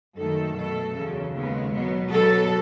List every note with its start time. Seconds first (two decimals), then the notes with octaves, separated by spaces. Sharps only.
0.17 F#2 D#3 A3 A4
0.56 B2 A3 A4
0.95 E2 C#3 F#3
1.33 D#2 C#3 G#3 B3
1.72 B2 F#3 B3
2.11 B2 F#3 B3 A4